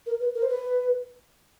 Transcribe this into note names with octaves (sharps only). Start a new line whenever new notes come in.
A#4
B4
A#4
C5
B4